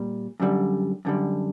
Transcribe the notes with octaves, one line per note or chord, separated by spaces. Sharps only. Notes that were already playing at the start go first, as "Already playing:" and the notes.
Already playing: A#2 G3
F#2 D3 G3
F#2 D3 G3